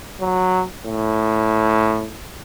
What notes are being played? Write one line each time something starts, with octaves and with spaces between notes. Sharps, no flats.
F#3
A2